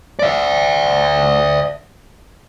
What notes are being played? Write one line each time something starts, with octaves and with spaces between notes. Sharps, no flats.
D5 E5